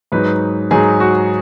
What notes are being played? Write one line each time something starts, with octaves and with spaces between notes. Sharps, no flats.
G#2 F#3 D#4 B4
G#2 F#3 D#4 G#4
F#4